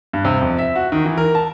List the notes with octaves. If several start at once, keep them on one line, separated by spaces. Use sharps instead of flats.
G2
C3
F2
E5
F#4
D#3
E3
A#4
A5